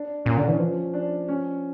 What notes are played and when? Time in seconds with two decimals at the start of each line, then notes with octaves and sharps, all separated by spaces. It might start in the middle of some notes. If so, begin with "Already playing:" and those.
Already playing: D4
0.25 A#2 C#4
0.37 D3 D4
0.48 E3 C#4
0.59 F3
0.93 D4
1.28 C#4